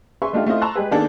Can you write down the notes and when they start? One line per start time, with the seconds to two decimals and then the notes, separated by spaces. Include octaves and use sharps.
0.22 G#4 B4 E5 C6 C#6
0.33 G#3 A3 D4 D#4 F4 G4
0.46 A3 C4 E4 F4 C5 D#5
0.61 A5 A#5 C6 C#6 E6 F#6
0.76 G#3 G4 G#4 B4
0.91 D#3 A#3 B3 D4 G#4 A4